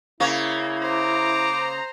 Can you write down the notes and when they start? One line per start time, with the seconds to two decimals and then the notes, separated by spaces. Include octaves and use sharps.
0.20 C#3 A#3 E4 C#5
0.82 C5 A#5 D6